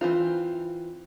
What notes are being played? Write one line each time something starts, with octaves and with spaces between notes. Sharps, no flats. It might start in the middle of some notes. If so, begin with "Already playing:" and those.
E3 C4 F4